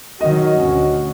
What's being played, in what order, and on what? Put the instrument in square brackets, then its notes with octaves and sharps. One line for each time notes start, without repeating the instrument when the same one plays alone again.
[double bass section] D#3 F#3 [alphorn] F#4 [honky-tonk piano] D#5
[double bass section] D2 C#4